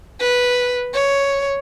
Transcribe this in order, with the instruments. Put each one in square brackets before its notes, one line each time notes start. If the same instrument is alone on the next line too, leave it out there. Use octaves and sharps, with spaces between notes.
[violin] B4
C#5